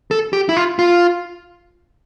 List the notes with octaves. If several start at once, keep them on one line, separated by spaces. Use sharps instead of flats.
A4
G4
E4
F4
F4